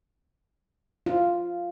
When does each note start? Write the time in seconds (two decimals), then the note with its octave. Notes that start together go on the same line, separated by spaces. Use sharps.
1.06 F4